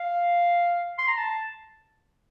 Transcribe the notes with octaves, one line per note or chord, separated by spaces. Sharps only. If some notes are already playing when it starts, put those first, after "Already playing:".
Already playing: F5
C6
A#5
A5